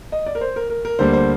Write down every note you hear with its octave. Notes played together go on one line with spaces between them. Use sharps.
D#5
D5
A#4
C5
A#4
A#4
A#4
D2 D3 G3 A#3 C5
C5